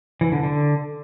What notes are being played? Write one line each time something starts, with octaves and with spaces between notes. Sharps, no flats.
E3
D3
D3